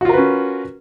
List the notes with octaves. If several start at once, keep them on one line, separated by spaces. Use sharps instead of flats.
C#4 F4 F#4 A#4 B4